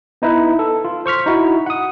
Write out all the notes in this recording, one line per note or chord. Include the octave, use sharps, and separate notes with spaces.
B3 D#4 E4 B4
A4
F4
C5 C#6 F6 B6
D#4 E4 F#4
F#5 D#6